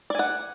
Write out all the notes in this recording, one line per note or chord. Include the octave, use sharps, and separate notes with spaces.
D5 F#5 G#5